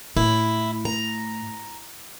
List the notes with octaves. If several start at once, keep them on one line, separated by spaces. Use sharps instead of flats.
A2 E4
A#5